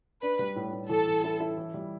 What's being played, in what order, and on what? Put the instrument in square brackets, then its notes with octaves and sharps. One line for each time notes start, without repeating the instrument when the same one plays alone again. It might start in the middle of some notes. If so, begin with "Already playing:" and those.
[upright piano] D4 [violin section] B4
[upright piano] G3
A2
A2
[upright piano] E3 [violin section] A4
[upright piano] E3
E4
E4
E3
G3